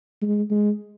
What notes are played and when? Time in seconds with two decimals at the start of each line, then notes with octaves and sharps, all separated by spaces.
0.22 G#3
0.51 G#3